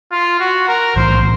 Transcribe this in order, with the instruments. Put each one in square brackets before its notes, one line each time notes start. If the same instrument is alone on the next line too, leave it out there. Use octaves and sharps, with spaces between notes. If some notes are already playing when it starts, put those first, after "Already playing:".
[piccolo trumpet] F4
F#4
A#4
[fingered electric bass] B1 A2 E3 [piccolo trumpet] C5